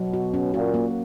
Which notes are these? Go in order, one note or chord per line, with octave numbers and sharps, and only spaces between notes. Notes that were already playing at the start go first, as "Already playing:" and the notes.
Already playing: B2 F#3
F#4
C#4
A#2 F#4
A#3